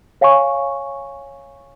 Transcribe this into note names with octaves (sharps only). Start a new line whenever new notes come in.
C#5 F5 G#5 C#6